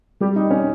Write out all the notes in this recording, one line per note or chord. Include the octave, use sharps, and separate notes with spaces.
G3 G4
D#4
C#4